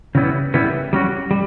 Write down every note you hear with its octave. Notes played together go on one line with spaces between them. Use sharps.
C#3 E3 G3 B3 E4
C#3 E3 G3 B3 E4
G3 C#4 F#4
G3